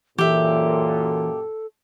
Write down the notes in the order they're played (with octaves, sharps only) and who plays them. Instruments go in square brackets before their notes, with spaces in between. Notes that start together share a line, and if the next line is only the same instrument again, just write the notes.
[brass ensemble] F#2 A#2 [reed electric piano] E3 [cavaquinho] G4 E5 [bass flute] A4